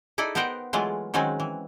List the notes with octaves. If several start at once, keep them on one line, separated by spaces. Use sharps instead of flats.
D#4 E4 A4 D5 D#5
B3 D#4 A#4 C5 F#5 G5
E3 F#3 G#3 A3 F4
D#3 F#3 G#3 C4 C#4 F#4
E3